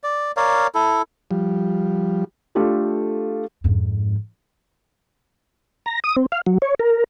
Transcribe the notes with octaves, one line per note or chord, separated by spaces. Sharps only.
D5
A#4 C#5 D5 F5
E4 A4
F3 G3
A3 D4 F4 G4 A4
F2 G#2
A#5
D#6
C4
F5
F#3
C#5
A#4